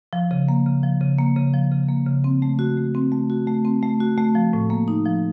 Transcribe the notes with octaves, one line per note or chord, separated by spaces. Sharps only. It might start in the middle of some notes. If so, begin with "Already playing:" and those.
F3
C#3
A#3
C#3
F3
C#3
A#3
C#3
F3
C#3
A#3
C#3
C4
A3
F#4
A3
C4
A3
F#4
A3
C4
A3
F#4
A3
F3
A2
A#3
D#4
F3